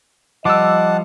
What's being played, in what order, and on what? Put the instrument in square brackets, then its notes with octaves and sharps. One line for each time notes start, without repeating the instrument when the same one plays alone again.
[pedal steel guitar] F3 G3 [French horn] D#5 [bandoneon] F#5 A5 [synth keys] D6 E6